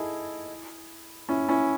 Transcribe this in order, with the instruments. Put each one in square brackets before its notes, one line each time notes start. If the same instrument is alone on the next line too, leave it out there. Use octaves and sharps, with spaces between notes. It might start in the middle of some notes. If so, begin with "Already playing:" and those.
Already playing: [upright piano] D#4 E4 G#4 A4
C#4 E4
C#4 E4